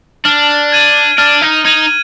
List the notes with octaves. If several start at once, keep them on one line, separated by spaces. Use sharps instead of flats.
D4 F6
G#6 D#7 F#7
D4 F6
D#4
D#4 G#6 D#7 F#7